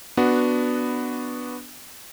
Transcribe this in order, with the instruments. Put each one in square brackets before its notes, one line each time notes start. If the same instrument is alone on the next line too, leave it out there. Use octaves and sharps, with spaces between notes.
[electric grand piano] B3 D4 F#4